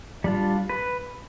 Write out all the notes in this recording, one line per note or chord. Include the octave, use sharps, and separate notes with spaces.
G3 D4 F4
B4